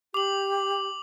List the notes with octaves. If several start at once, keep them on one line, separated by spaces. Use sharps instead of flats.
G4 D6 F#7